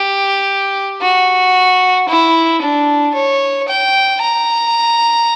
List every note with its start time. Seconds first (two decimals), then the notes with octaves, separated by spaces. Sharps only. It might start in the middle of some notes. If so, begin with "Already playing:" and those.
Already playing: G4
1.02 F#4
2.08 E4
2.62 D4
3.14 C#5
3.68 G5
4.20 A#5